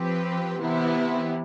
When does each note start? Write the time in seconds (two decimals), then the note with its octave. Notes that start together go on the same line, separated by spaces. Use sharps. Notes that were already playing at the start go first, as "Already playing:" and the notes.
Already playing: F3 C4 G4 B4
0.61 C3 E3 B3 E4